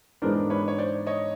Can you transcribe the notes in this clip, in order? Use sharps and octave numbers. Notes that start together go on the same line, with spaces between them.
G#2 E3 G#3 B3 D4 A#4 C5
B4 C#5
C#5
C5 D5
C#5 D#5